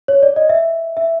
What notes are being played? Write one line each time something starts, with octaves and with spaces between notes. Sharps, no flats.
C#5
D5
D#5
E5
E5